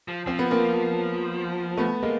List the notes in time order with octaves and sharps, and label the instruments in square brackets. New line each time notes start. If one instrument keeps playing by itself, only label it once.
[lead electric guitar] F3
[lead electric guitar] F3 [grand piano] C4
[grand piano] B3
A#3 C4
A3 B3
G#3 A#3